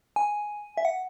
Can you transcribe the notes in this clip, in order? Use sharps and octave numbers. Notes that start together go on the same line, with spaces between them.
G#5
E5
F#5